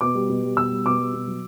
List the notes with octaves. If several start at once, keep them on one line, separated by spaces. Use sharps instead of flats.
B2 D6
G3
B2
G3
B2 E6
G3
B2 D6
G3
B2
F#3